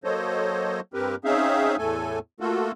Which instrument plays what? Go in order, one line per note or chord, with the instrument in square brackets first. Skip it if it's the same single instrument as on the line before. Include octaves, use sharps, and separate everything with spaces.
[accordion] F#3 A#3 A4 C5 C#5 D#5
G2 C4 G4 A#4 B4
C4 C#4 D#4 G#4 E5 F5
E2 A2 A3 A4 G#5
A3 A#3 F4 F#4 A4